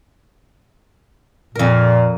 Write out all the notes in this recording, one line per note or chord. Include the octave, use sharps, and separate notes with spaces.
F2 A#2 A#4